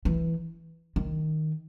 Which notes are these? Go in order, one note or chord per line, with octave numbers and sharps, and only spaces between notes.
E3
D#3